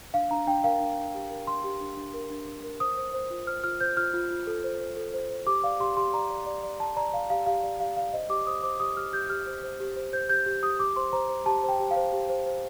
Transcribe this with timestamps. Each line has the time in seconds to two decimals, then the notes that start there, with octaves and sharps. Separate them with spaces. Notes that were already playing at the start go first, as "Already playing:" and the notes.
0.14 D4 F5
0.31 D4 A#5
0.47 D4 G5
0.64 A#4 F5
0.80 D4
0.98 D4
1.14 G4
1.31 A#4
1.47 D4 C6
1.64 G4
1.81 D4
1.97 D4
2.14 A#4
2.30 D4
2.47 D4
2.64 A#4
2.80 C5 D#6
2.97 C5
3.14 C5
3.30 F4
3.47 C5 F6
3.64 F4 F6
3.80 C5 G6
3.97 F4 F6
4.14 F4
4.30 F4
4.47 A4
4.64 C5
4.80 C5
4.97 A4
5.14 C5
5.30 C5
5.47 G4 D6
5.64 D5 F5
5.80 G4 C6
5.97 G4 C6
6.13 D5 A#5
6.30 D5
6.46 D5
6.63 D5
6.80 D5 A5
6.97 D5 A#5
7.13 D5 F5
7.30 G4 F5
7.46 G4 F5
7.63 D5 F5
7.80 G4 F5
7.97 D5 F5
8.13 C5 D#5
8.29 G4 D6
8.47 C5 D#6
8.63 C5 D6
8.80 G4 D#6
8.96 G4 F6
9.13 G4 G6
9.29 G4 F6
9.47 C5
9.63 C5
9.80 G4
9.96 C5
10.13 C5 G6
10.29 G4 G6
10.46 G4
10.63 G4 D#6
10.80 G4 D6
10.96 C5 C6
11.13 C5 A#5
11.29 C5
11.46 G4 A5
11.63 C5
11.69 G5
11.80 G4
11.91 F5
11.96 C5
12.13 G4
12.29 C5
12.46 C5